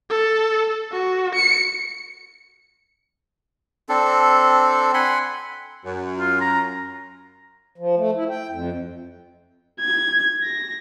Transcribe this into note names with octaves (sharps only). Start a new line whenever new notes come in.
A4
F#4
C#7
C4 D4 A4
F#5 G#5 B5 C6
F#2
F4
A#5
F3
A3
E4
G5
F2
G#6
A#6